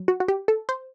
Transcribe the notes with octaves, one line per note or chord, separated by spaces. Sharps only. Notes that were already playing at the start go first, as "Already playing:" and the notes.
Already playing: F#3
F#4
F#4
G4
A4
C5